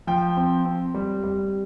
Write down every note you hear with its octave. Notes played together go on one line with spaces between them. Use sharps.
F3 G5
C4
C4
G3
G3